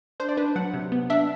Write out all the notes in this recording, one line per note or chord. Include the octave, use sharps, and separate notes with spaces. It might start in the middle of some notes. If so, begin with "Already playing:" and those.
D4 C5
D5
D4 B4
F#3 F#5
C3
B3
D4 E5